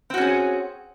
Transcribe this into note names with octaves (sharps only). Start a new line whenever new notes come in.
C4 C#4 F#4 G#4